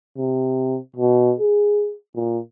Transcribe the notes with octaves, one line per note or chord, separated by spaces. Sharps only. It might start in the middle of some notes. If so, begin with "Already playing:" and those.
C3
B2
G#4
A#2